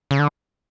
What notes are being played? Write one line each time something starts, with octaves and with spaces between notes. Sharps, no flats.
C#3
D3